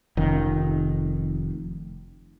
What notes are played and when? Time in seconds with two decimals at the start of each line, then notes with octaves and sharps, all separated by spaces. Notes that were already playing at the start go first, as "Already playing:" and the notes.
0.17 F1 D#3 C#4